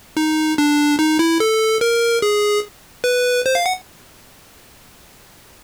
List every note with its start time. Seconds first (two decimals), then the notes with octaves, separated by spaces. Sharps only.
0.17 D#4
0.58 D4
0.99 D#4
1.19 E4
1.40 A4
1.81 A#4
2.22 G#4
3.04 B4
3.46 C5
3.55 F5
3.66 F#5